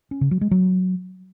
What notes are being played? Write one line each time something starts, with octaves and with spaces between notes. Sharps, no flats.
C#4
C#3
F#3
G#3
F#3